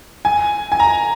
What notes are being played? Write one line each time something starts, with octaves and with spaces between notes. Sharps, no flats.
G#5
G#5
A#5